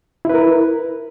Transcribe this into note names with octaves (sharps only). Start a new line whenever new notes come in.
E4 A#4 B4